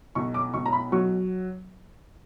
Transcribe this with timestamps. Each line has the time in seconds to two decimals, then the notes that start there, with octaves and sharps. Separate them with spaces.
0.15 B1 C#6
0.34 D6
0.54 B1 C#6
0.66 A#5
0.73 B5
0.92 F#3 C#6